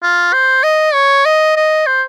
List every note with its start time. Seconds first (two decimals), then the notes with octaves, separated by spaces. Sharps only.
0.03 F4
0.33 C5
0.63 D#5
0.94 C#5
1.25 D#5
1.56 D#5
1.86 C5